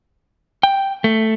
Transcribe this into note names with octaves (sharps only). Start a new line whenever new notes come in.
G5
A3